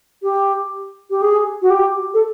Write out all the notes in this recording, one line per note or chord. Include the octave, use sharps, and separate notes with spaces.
G4
G4
G#4
F#4
G4
A4